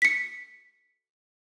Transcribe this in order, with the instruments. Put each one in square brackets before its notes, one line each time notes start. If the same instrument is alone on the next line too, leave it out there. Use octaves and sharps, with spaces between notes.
[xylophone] B6 C#7